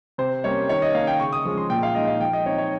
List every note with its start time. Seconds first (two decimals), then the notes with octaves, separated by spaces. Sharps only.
0.18 C3 C5
0.44 G3 A#3 C#4 C#5
0.69 D#3 C#5
0.82 D#5
0.94 A#3 C#4 F5
1.07 G5
1.20 C#3 C#6
1.33 D#6
1.45 F3 G#3 C#4
1.58 C6
1.70 A#2 G5
1.83 F5
1.95 G#3 D#4 D#5
2.08 F5
2.21 F3 G5
2.33 D#5
2.46 C4 D#4 C#5
2.58 C#5